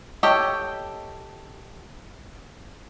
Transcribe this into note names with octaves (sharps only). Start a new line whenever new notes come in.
G4 A4 C#5 D#5